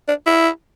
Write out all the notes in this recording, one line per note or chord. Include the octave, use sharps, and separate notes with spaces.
D4
E4